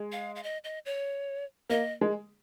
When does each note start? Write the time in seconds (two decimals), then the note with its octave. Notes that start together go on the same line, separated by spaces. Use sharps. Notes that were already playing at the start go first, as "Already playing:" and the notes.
Already playing: G#3
0.12 F5
0.36 F5
0.43 D#5
0.64 D#5
0.86 C#5
1.69 A#3 D#5
2.01 G#3